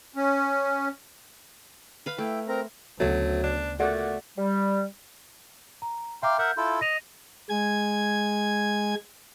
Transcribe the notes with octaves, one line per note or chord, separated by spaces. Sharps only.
C#4
B4 F5 B5
A3 E4 G5
C4 A#4 A#5
D2 C#3 F#3 A3 B3
D4
A#2 A3 F#4 D5 F#5
G3
A#5
E5 F5 G5 A#5 C6 D6
A#4 E5 F#5 G6
E4 F4 A4
D#5 A#6 D#7 F7
G#3 G#5 G#6